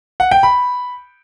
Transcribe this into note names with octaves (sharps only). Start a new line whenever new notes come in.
F#5
G5
B5